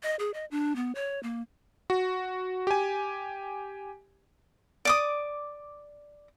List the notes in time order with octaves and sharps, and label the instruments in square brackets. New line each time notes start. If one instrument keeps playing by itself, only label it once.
[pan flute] D#5
G#4
D#5
D4
B3
C#5
A#3
[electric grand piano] F#4
G4 G#5
[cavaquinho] D5 D6 D#6